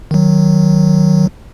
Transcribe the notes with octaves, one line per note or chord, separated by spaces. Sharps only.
D#3 F#3